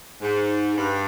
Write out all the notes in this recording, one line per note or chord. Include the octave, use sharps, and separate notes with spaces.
G#2
G2